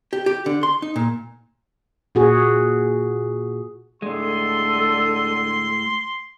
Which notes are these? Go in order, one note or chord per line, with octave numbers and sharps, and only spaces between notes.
G4
G4
D3
C6
D#4
A#2
A#2 F#4 G#4
A2 D3 G#3 A4 C6